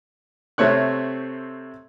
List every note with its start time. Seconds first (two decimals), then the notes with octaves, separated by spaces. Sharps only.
0.58 C3 A3 C4 C#5 F#6